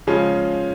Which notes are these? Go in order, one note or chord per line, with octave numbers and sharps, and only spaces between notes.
C#3 F3 G#3 C#4 F4